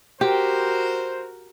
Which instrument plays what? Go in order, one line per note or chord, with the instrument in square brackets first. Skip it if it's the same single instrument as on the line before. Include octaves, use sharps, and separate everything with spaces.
[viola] F#4 A#4 [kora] G4 [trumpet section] C5